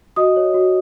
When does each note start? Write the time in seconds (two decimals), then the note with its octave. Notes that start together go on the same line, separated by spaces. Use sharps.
0.16 F#4 D#5 D#6
0.36 C#5
0.54 F#4